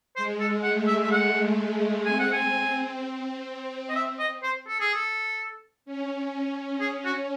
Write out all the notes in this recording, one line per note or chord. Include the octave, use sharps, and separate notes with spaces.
G#3 C5
A4
A3 F#5
E5
E5
F#5
C4 G#5
F#5
G#5
C4
C4
D#5
E5
D#5
C5
A4
G#4
A4
C#4
G#4
F#4